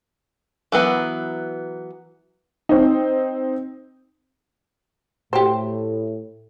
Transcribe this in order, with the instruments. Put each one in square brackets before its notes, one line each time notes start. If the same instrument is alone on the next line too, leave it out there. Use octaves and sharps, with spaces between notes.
[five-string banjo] E3 F#3 B3
[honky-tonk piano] C4 D#4
[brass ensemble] A2 [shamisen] G4 C5